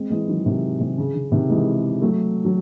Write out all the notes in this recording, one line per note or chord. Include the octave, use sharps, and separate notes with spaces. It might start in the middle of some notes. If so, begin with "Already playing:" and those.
Already playing: G#3 C4
E3 G#3
D#3 F#3
C3 D#3
C3
C#3
C#3
C3 D#3
E3 G#3
F#3 A3
F#3